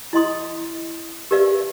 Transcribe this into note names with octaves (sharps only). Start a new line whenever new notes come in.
E4 D#5 C6 D#6
G4 A#4 B4 D5 E5 F5